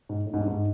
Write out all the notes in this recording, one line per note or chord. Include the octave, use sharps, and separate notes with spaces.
G#2
A2
G#2
G2
G#2